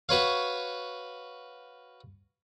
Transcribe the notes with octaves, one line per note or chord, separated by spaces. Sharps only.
F#4 B4 C#5 F5